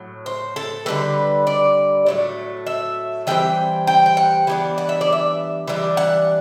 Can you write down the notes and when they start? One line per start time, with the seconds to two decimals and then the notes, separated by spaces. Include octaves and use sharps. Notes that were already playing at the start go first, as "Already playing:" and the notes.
Already playing: A2 F#3
0.26 C5
0.56 A4
0.86 D3 G3 C4 B4
1.47 D5
2.06 A2 F#3 A3
2.67 E5
3.27 E3 G3 C4 G5
3.87 G5
4.06 G5
4.17 F#5
4.47 E3 G3 B3 D4
4.78 F#5
4.89 E5
5.01 D5
5.13 E5
5.67 E3 G3 D4
5.97 F#5